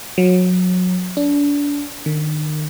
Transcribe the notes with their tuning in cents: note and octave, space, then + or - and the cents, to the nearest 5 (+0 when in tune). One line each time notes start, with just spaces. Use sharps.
F#3 -25
D4 -30
D#3 -35